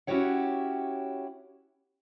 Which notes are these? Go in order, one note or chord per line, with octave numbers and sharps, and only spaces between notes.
C#4 E4 F#4 G4 C#5 F#5